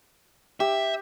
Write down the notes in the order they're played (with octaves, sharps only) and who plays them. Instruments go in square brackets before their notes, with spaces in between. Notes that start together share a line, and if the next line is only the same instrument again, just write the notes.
[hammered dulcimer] G4 [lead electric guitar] E5